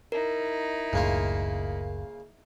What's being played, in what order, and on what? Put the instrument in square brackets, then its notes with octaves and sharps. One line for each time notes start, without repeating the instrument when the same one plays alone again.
[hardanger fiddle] D#4 E4 [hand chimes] A#4
[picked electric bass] F#1 C#2 A2 [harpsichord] C#3 A#3 F4